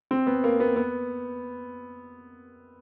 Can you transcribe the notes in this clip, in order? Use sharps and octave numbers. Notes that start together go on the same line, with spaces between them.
C4
B3
A#3
B3
B3